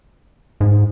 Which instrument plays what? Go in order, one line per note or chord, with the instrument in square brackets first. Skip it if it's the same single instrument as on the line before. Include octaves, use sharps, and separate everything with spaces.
[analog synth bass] G#2